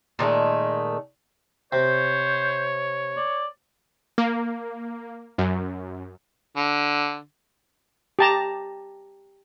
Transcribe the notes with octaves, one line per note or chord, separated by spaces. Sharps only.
A#2 D#3 G#3 A3
C3 C5 C#5
D5
A#3
F#2
D3
G4 A5 A#5